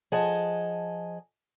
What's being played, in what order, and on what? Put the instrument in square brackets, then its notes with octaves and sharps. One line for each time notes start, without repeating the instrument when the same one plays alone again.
[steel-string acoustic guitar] F3 G#4 D#5 F#5 G#5 A5